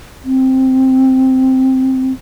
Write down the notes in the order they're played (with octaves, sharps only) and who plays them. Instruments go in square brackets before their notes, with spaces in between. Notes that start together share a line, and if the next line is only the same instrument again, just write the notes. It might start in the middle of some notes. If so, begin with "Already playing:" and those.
[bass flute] C4